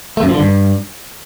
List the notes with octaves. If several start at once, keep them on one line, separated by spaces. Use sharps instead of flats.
A3
F#2
F3
D3
G2